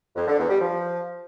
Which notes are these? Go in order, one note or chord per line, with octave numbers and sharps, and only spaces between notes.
F2
D3
E2
G3
F3